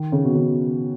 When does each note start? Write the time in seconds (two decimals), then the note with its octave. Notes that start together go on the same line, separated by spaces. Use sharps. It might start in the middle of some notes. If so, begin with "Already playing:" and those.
Already playing: D#3
0.12 C#3
0.24 B2
0.35 C#3